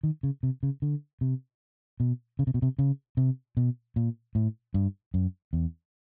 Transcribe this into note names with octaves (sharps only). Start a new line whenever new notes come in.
D#3
C#3
C3
C#3
D3
C3
B2
C#3
C3
B2
C3
C#3
C3
B2
A#2
A2
G2
F#2
E2